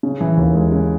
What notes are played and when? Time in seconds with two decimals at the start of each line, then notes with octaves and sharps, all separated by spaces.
0.03 C#3
0.21 E3
0.37 D#2
0.55 G#3
0.72 C#3